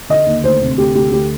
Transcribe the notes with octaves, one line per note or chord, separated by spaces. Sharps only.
D3 D#5
D#2
D2 C5
C3
D2 G4
D2 G4
D2 G4